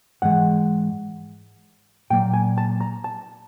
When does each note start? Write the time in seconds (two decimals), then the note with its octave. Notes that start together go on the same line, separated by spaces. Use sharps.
0.22 G#2 E3 G#3 F#5
2.10 A#2 F#3 A#3 G5
2.33 G#5
2.58 A5
2.81 A#5
3.04 A5